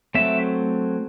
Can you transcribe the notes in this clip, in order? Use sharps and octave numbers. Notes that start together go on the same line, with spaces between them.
F#3 A3 C4 E5